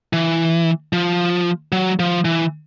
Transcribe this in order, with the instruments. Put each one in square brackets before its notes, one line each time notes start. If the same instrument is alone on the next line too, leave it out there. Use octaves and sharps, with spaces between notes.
[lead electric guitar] E3
F3
F#3
F3
E3